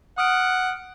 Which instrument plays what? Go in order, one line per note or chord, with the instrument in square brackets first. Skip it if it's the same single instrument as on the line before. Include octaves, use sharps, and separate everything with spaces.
[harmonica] F#5 [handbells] D#6 F6 D7